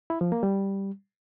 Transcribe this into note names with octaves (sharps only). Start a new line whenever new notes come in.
E4
F3
A#3
G3